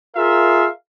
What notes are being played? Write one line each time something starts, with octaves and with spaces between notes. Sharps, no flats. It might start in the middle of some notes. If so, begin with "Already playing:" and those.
F4 G#4 A#4 E5 F5